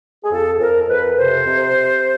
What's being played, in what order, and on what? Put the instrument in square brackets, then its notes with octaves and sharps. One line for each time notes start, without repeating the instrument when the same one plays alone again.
[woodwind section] G#4
F2 A4
F2 A#4
F2 B4
C3 C5
C3
C3